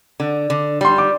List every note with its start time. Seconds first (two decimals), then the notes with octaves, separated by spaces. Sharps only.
0.20 D3
0.50 D3
0.81 G3 C6
0.98 D6